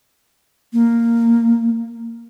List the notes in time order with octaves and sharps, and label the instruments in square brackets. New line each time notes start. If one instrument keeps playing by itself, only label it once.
[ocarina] A#3